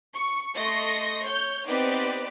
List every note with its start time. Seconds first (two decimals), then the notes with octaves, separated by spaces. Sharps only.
0.13 C#6
0.55 A3 D#5 C6 C#6 A#6
1.23 C#5 G6
1.65 B3 C4 D#4 G4 B4 D5